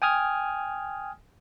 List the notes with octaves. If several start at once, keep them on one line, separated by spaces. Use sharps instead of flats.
G5 G#5 D#6 F6 G#6